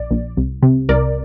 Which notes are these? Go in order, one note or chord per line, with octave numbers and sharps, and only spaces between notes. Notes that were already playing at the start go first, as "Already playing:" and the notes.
Already playing: A#1 D5
A#1
C2
C3
C2 A#4 D5